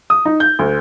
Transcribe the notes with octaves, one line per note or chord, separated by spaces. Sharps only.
D#6
D#4
G6
D2